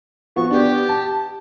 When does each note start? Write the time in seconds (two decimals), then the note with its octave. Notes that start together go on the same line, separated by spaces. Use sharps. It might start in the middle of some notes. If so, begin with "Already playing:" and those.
0.36 F3 B3 F#4 C#6
0.51 B3 D4 G4
0.89 A5